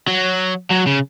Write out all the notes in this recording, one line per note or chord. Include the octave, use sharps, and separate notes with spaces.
F#3
F#3
C#3